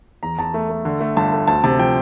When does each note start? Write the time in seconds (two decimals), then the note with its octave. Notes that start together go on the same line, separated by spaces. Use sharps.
0.23 E2 A#5
0.38 E2 A5
0.54 A3
0.70 A3
0.85 D3
1.00 A3
1.16 G1 A5
1.32 A3
1.47 D2 A5
1.64 C3 A5
1.78 F3 G5